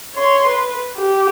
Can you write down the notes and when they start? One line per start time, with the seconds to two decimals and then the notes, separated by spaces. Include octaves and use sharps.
0.15 C#5 C6
0.47 B4
0.97 G4